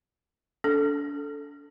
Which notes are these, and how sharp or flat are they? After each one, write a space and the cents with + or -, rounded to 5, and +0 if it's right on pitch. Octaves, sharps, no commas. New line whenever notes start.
D4 -35 A4 +0